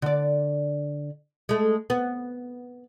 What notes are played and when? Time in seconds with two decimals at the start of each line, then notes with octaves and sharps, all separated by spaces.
0.02 D3 D5
1.49 G#3 A3
1.90 B3